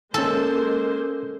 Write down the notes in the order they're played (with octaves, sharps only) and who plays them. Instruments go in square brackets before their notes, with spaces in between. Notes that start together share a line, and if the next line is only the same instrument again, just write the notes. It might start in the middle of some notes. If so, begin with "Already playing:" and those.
[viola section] G#3 A#3 C5 [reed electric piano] C#4 E6 [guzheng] A4